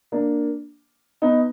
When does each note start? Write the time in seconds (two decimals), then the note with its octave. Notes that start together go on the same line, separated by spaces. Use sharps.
0.12 A#3 D4
1.22 B3 D#4